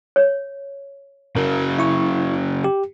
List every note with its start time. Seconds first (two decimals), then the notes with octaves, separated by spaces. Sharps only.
0.16 C#5
1.36 C#3 F#3 A#4
1.79 E4 C#6
2.64 G4